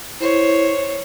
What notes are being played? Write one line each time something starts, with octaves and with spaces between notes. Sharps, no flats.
E4 C5 C#5